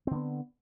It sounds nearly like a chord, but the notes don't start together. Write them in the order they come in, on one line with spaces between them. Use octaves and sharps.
C4 D3 B3